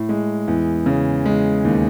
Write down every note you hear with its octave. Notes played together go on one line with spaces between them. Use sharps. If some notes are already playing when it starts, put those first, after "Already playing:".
Already playing: A2
G#3
E2
C#3
G#3
D#2